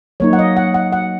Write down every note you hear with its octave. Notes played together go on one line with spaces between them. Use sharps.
F#3 A#3 D#4 C#5
F#5
D#5
F#5
F#5
F#5